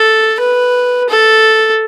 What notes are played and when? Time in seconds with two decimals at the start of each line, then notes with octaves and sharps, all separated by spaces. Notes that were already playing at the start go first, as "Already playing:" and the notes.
Already playing: A4
0.40 B4
1.09 A4